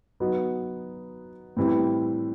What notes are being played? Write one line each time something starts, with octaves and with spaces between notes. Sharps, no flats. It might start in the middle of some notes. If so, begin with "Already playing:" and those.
F#3 B3 D#4 F#4
A2 E3 G3 C4